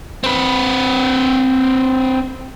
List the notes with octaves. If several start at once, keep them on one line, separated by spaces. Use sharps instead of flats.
C4 B4